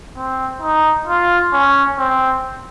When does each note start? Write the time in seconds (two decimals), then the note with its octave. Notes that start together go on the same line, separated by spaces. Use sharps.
0.16 C4
0.61 D#4
1.07 F4
1.53 C#4
1.98 C4